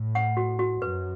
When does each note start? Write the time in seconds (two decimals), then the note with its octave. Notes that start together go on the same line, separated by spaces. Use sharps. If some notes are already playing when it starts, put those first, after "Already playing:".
Already playing: A2
0.15 F#5
0.37 F#4
0.59 F#4
0.82 F#2 B4